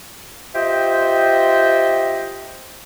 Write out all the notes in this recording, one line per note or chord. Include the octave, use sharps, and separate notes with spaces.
F4 G4 C5 D#5 E5 G5